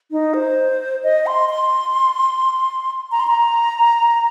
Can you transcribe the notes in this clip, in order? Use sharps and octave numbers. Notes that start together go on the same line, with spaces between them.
D#4
C5
D#5
C6
C6
A#5
C6
A#5